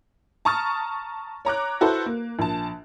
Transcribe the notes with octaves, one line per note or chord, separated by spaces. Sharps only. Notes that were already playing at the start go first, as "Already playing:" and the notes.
A5 A#5 C#6 D#6 F6 A6
C#5 A#5 D6 F#6
E4 F#4 A4 B4 C5
A#3
A#1 A5